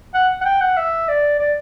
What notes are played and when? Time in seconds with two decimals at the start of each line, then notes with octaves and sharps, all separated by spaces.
0.14 F#5
0.41 F#5
0.45 G5
0.61 F#5
0.77 E5
1.08 D5
1.39 D5